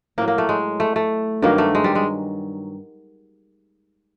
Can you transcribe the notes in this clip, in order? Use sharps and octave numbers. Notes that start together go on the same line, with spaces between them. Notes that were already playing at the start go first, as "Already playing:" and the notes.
A2 F#3 A#3
A#3
A3
G#3
A3
A3
G2 D#3 F#3 A#3
A3
G#3
G3
G#3